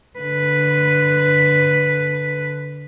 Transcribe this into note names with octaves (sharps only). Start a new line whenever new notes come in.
D3 B4